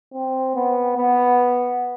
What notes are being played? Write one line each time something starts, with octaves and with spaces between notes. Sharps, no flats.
C4
B3
B3